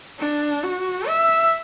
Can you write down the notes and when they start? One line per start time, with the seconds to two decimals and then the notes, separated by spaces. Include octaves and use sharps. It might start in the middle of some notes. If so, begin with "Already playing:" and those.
0.19 D4
0.64 F#4
1.08 E5